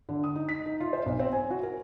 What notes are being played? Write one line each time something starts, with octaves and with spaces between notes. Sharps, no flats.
D3
D#6
D#4
B6
D#4
F4
C5
B1
C4
G#5
F#4
A#4